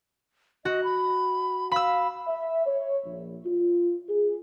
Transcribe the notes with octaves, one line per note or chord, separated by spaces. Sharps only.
F#4 D#5
B5
F5 B5 E6
E5
C#5
A#1
F4
G#4